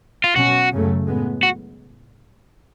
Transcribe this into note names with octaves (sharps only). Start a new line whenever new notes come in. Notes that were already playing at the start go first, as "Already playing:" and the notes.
F4
B2 F#3 C#4 F#4
F#2 C#3 F#3 A3
A2 G#3 B3
F#4